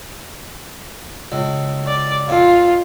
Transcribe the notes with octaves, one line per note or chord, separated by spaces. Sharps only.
C#2
D5
F2 F4